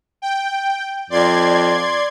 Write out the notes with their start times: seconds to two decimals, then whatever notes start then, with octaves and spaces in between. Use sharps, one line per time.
0.22 G5
1.10 F2 D5 C6 G#6